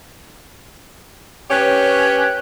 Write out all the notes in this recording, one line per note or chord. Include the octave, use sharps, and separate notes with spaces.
C#4 G4 B4 C#5